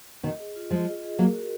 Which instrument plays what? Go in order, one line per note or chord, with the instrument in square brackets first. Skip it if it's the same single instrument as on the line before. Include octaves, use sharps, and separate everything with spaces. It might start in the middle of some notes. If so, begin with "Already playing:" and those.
[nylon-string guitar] B2 D#3 [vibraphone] D#5
[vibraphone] G#4
F4
[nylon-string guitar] F3 G#3 [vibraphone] F4
[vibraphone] D#5
G#4
[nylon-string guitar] F#3 A#3 [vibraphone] A#4
[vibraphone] F#4